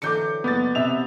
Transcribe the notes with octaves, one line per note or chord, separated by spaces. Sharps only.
D3 E3 F#3 D6 G6 C#7
F#1 B3 D6 A6
C3 E5 F7